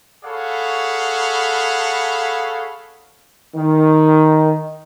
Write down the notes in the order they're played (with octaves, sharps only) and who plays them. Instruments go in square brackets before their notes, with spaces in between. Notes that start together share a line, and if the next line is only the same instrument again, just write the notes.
[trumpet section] G#4 A4 C#5 F5 F#5 B5
[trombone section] D#3